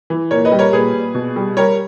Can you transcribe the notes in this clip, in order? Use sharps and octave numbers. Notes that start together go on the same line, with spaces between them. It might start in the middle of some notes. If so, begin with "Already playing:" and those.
E3
A#2 A#4 C#5
B4 D#5
G3
A#4 C#5
A#2 G#4 B4
A#2
B2
G3
G3 A#4 C#5